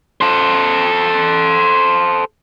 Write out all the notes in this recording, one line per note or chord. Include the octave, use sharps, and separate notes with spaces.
A4 C5